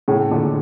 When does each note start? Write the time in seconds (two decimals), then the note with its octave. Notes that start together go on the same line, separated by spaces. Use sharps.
0.08 A2 C#3
0.31 A#2 D3